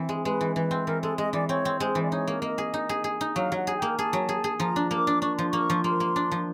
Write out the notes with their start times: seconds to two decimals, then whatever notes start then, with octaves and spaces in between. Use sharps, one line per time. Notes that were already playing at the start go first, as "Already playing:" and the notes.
Already playing: E3 C4
0.09 G#3
0.25 G#3 B4
0.41 E3
0.56 E3 B4
0.71 C4
0.87 E3 A#4
1.02 G#3 A4
1.18 G#3 D#5
1.33 E3 D5
1.49 C4 C#5
1.65 C4
1.80 G#3 C5
1.95 E3
2.03 D5
2.11 D#4 C#5
2.28 A#3
2.42 A#3 D#5
2.58 G#4
2.74 D#4
2.89 G#4
3.04 G#4
3.21 D#4
3.36 F#3 F5
3.52 F#3 F#5
3.67 G#4
3.77 A#3 G5
3.98 G#4 A5
4.13 F#3
4.29 G#4
4.44 G#4
4.60 F3 A#5
4.76 D4
4.91 A#3 D6
5.07 D4
5.22 D4 C#6
5.36 F3 C6
5.50 A#3 C#6
5.70 F3
5.84 A#3 C6
6.00 A#3
6.16 D4
6.32 F3